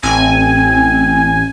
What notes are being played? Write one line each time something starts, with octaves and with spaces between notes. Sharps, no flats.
A1 C4 G#5